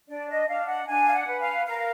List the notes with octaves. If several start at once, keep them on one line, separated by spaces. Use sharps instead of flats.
D4 D5
D#5
D4 F5
F#5
D4 G#5
F5
F#5
B4
F5
A#4 F5